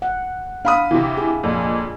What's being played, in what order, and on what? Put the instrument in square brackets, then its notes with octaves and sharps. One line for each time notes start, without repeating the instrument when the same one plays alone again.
[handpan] F#5
[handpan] D4 [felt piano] F5 B5 D#6
[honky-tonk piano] C3 E3
[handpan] G#4
[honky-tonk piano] F2 A#2